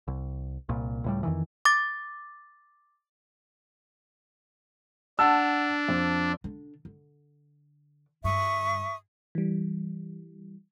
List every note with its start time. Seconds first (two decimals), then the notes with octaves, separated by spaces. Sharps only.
0.08 C2
0.69 C2 A#2
1.04 C#2 A2 G3
1.23 F2 D#3 E3
1.65 D6 A6
5.19 D4 F#5 A5 E6
5.88 F2
6.44 D3 D4
6.85 D3
8.24 G2 D3 E5 C#6 D#6
9.35 E3 G3